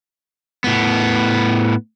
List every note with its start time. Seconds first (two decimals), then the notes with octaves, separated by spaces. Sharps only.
0.64 A2 B3